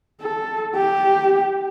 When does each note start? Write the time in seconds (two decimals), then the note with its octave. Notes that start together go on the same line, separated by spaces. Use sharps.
0.21 A4
0.75 G4